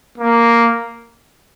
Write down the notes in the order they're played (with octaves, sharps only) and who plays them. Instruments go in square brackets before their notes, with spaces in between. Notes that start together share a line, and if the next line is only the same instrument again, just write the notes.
[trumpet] A#3